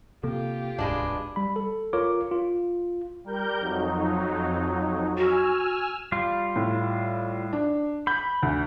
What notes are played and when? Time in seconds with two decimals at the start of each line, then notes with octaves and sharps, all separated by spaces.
0.23 C3 A#3 F4 G4 A4
0.78 D1 C2 G#2 B2 G#3 D4
1.36 G3 B5
1.56 A4
1.93 F4 A#4 C#5 D6
2.31 F4
3.24 G3 A#4 G6
3.60 F2 F#3 D#4
5.18 F#4 G#5 E6 F6
6.12 G3 F4
6.56 A2
7.53 D4
8.07 B5 G6
8.43 D2